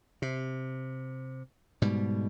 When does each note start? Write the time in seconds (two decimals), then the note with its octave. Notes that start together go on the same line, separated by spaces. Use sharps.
0.22 C3
1.82 G#2 B2 G3